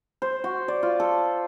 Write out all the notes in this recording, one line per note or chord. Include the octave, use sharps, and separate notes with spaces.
C5
F#4
D5
F4
A4